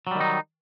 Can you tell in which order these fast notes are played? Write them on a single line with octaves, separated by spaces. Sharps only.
F#3 G3 D#3 D#4